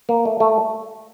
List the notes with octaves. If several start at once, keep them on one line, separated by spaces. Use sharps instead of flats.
A#3
A3
A3